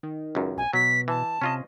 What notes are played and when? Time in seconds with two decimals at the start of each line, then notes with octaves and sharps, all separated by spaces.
0.03 D#3
0.35 C#2 F#2
0.57 B1 G#5
0.73 B2 F#3 B6
1.08 E3 A5
1.41 C3 C#4 F4 D#5